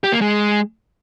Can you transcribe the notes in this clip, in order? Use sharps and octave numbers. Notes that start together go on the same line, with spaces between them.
G4
A#3
G#3